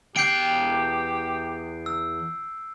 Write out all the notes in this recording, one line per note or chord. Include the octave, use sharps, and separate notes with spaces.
E2 G4 G5 G6 C7 D7
E6